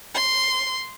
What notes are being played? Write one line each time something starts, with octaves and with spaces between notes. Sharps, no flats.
C6